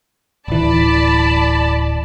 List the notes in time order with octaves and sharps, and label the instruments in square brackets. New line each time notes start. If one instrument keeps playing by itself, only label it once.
[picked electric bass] D1 E3 [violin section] D5 A5 B5